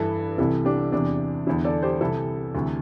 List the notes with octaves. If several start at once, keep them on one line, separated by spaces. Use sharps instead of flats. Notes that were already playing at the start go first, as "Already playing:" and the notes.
Already playing: G2 E3 E4 A4
C2 C3 E3 E4 A4
D4 G4
E2 C3 E3 D4
E2 D3 E4
A4 D5
G4 C5
C2 C3 E3 E4 A4
D2 C3 E3